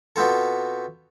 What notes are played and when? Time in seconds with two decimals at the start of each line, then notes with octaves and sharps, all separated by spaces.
0.16 B2 B3 C4 F4 A4